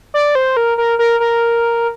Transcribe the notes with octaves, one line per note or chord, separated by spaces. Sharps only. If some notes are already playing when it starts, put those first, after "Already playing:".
D5
C5
A#4
A#4
A#4
A#4